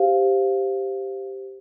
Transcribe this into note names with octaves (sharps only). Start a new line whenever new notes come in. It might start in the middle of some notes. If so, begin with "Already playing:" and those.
Already playing: G4 C5 F5